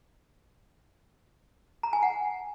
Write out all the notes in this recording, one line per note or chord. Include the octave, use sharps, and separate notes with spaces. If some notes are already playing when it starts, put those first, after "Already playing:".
A#5
G#5
F#5